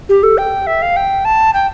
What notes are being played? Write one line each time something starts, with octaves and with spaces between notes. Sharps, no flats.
G4
A4
G5
E5
F5
G5
A5
G5